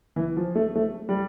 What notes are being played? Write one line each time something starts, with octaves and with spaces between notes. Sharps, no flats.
E3
F3
A3
A3
G3